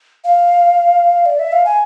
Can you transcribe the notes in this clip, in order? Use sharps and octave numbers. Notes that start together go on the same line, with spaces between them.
F5
D5
E5
F5
G#5